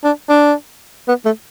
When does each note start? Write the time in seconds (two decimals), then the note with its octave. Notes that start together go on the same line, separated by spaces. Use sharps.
0.04 D4
0.29 D4
1.08 B3
1.25 A3